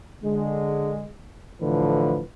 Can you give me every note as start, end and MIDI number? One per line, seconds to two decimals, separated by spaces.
0.24 1.07 50
0.24 1.07 56
1.62 2.22 45
1.62 2.22 50
1.62 2.22 52
1.62 2.22 53
1.62 2.22 71